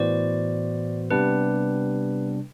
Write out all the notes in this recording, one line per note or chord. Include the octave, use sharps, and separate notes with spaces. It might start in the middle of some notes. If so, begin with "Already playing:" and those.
Already playing: A2 E3 B3 F#4 C5 D5
C3 G3 B3 D4 B4